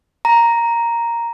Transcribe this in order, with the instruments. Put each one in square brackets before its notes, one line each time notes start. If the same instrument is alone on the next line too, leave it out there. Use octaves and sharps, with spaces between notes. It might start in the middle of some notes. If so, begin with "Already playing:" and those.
[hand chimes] A#5